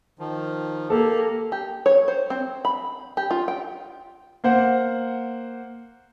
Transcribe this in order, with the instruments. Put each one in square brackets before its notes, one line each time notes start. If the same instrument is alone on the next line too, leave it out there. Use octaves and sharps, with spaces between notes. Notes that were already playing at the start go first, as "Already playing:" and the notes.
[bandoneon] D#3 F3
[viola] A#3 [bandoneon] G4 [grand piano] A4
[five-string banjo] G4
C#5
C5
C4
B5
G4
F4
G5
[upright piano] A#3 C5 F#5